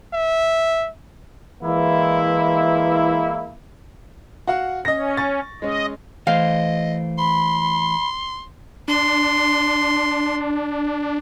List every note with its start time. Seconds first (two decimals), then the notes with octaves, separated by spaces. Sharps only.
0.13 E5
1.63 E3 G#3 A#3 E4
4.47 F#4 F5 F#5
4.85 C#4 D#5 A#6
5.17 C#6 A6
5.62 G#3 C#4 D#5
6.27 E3 A3 C5 D#5 F5
7.18 B5 C6
8.88 D4 C6